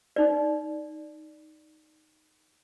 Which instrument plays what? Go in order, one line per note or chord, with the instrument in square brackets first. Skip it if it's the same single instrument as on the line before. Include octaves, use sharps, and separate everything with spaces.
[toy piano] D#4 D5